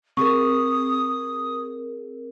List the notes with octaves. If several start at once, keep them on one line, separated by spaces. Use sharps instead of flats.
C4 G#4 A#4 C#6 D#6